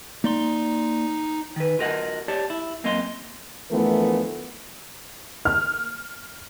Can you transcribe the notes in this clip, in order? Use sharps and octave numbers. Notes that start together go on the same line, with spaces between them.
A#3 D#4 D5 C6
D#3 B4
F4 F#4 A#4 D#5 F#5
G4 C#5 D5 A5
E4
F#2 A#3 C4 D#5 F5 C6
D2 E3 F3 A3 B3 A#4
F6